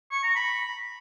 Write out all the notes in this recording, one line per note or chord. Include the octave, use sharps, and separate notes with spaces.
C#6
A#5
B5